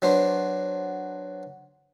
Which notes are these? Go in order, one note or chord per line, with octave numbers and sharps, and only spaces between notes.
F#3 B3 D4 C5